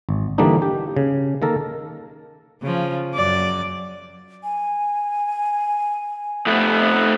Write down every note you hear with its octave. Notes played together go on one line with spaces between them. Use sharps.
G#1
D3 E3 G3 A#3 D4 D#4
G4
C#3
D#3 A#3 A4 A#4
C#3 F3
F#2 D5
G#5
F2 A3 B3